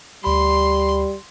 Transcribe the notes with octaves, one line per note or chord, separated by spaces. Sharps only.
D2 G3 B5 C6